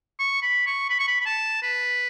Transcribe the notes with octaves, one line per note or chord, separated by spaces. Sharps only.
C#6
B5
C#6
B5
C#6
B5
B5
A5
B4